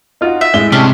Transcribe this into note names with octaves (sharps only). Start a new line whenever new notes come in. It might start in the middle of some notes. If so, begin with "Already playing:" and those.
D#4 F4 F#4
E5
A2 G#3 G7
C3 C#4 D4 G4